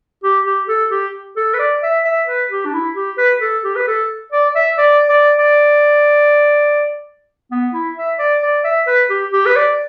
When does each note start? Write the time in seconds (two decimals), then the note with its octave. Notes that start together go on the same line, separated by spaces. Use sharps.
0.23 G4
0.45 G4
0.68 A4
0.91 G4
1.37 A4
1.54 B4
1.59 D5
1.83 E5
2.05 E5
2.27 B4
2.51 G4
2.65 D4
2.74 E4
2.95 G4
3.18 B4
3.42 A4
3.64 G4
3.76 B4
3.87 A4
4.32 D5
4.55 E5
4.78 D5
5.09 D5
5.38 D5
7.51 B3
7.74 E4
7.97 E5
8.19 D5
8.43 D5
8.64 E5
8.87 B4
9.10 G4
9.33 G4
9.46 B4
9.56 D5